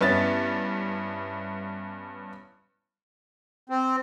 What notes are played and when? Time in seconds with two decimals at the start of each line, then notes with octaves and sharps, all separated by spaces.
0.01 G2 B3 C#4 E4 A6
3.70 C4